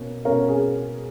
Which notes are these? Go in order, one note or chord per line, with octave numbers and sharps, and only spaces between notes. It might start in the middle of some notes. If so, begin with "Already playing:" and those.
Already playing: B2 A#3 C#4
B2 A#3 C#4 A#4
G#4